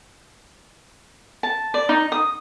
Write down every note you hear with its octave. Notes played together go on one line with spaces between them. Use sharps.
A5
D5
D#4
D#6